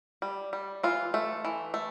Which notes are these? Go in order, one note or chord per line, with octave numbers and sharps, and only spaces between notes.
G3
G3
E3 F4
A3
E3
A3